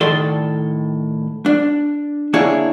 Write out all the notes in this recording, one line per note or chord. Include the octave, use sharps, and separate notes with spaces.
A2 D#3 A4 D5 C6
D4
D3 A#3 D4 E4 G#4 C#5